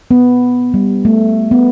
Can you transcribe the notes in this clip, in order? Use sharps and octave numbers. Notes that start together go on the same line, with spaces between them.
B3
G3
A3
B3